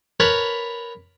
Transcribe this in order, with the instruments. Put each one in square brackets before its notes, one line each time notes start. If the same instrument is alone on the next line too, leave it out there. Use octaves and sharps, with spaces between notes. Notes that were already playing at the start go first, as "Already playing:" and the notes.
[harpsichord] A#4 B4 C#5 A5 B5